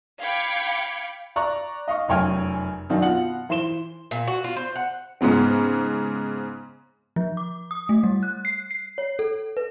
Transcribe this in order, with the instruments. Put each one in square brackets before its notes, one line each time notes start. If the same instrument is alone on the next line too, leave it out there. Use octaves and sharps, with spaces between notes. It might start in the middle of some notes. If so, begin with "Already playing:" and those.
[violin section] F5 G5 B5 D6 G#6 C#7
[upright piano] D5 A#5 C#6 F#6
D#5 F5 C#6
F1 F#2 C#5 G5 G#5 F6
F#2 D#3 C4 D4 D#4 F#4
B2 F4 F#5 F#7
E3 C5 C6 E7 G7
[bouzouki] A#2
F#4
F4
C5
F#5
[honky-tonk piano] G#2 C#3 B3 C4
[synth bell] F3
D6
D#6
A3
G3
F#6
C7
C7
C#5
A4
B4